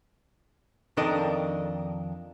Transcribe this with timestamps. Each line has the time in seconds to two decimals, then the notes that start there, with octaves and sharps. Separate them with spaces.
0.97 F2 D#3 D4 A4 A#4 D#5